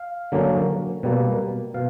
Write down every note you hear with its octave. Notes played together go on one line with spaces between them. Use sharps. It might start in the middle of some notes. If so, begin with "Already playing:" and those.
Already playing: F5
D3 F#3 A#3 C#4
B2 G3 A#3
B2 F5